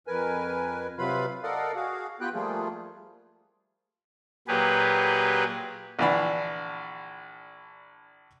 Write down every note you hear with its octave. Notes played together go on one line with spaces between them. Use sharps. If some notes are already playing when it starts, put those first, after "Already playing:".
F2 A#4 B4 G#5
C3 F#3 F4 B4 F5 B5
A4 A#4 D5 D#5 F5 F#5
F#4 G#4 F5
B3 F4 G4 B4 G5 F#6
F3 G3 A3 A#3 F4 G#4
A#2 F#3 G4 G#4 B4
A#1 D3 E3 D4 B5